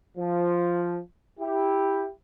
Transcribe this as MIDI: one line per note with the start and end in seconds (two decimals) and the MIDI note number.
0.18 0.99 53
1.40 2.08 64
1.40 2.08 67